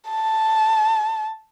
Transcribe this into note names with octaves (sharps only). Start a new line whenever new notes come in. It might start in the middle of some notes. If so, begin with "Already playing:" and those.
A5